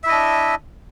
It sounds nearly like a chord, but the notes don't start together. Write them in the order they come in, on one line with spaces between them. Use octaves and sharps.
E5 E4 D#5 D4